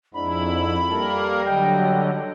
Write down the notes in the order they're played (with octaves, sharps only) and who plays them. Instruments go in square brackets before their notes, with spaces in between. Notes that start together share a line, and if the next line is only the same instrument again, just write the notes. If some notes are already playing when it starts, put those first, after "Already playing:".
[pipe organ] F2 E4 [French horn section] G#2 D4 [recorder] B5
[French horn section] G3 [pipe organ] A#3 A#4 [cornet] A4
[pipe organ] D3 F#3 [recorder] D#5 [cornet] G5